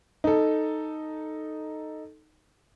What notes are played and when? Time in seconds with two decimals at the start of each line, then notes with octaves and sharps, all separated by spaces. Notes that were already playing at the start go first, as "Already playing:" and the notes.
0.24 D#4 A4